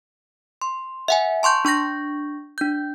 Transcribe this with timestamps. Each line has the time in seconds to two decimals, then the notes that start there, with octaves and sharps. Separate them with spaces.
0.62 C6
1.08 E5 F#5 G#5
1.43 A5 C6 C#6 G6
1.65 D4 C#6 G6 A#6
2.58 D4 G6